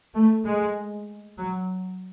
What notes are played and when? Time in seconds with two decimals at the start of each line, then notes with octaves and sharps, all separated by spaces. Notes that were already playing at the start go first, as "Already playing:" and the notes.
0.14 A3
0.45 G#3
1.37 F#3